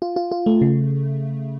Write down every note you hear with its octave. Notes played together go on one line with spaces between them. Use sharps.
F4
F4
F4
A3
C#3